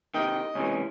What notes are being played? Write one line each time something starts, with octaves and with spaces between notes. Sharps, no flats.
C3 D#3 D#5 G5
C#2 C3 E3 C#4